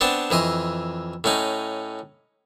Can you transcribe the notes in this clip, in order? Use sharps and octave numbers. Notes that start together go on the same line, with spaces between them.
B3 C4 D4 A5
F2 E3 D#5 C6
A2 C#4 D#4